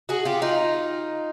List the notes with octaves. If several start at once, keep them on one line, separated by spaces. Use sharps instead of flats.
F#4 G#4
F4 G4
D#4 F4